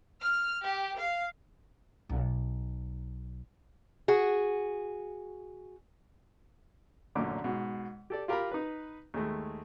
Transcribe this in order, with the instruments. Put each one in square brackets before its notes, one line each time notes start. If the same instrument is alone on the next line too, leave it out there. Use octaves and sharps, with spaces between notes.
[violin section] F6
G4
F5
[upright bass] B1
[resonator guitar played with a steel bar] F#4 G#4
[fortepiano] A1 F#2 A#2 D3 D6
G#2 B2
G4 A4 D5
F4 G4 A#4 F5 A#5 B5
D#4 B4
D#2 G#3 A3